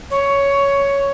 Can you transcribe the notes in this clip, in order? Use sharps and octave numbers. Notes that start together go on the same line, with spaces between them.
C#5